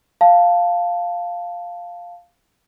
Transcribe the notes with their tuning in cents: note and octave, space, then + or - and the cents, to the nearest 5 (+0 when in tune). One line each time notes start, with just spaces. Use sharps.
F5 +0 A5 +0